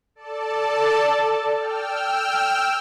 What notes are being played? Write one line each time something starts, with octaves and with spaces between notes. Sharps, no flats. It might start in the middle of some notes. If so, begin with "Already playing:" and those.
A4 D5 A5
G5 E6 F6